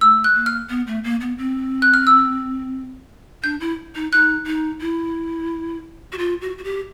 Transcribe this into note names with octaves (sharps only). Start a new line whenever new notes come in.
A3 E6
F#6
A#3
F6
B3
A3
A#3
B3
C4
F#6
F6
E6
D4 G6
E4
D#4
D#4 F#6
D#4
E4
F#4
F4
F#4
F#4
G4